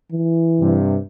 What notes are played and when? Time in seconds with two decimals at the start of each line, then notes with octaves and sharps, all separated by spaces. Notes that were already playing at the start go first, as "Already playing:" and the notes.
0.12 E3
0.60 G2 C3